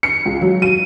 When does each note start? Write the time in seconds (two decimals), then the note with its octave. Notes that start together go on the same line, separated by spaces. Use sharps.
0.03 C#7
0.25 C#2
0.41 F#3
0.62 D#7